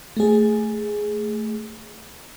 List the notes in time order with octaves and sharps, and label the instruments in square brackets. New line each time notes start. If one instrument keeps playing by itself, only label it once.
[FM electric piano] A3 G#4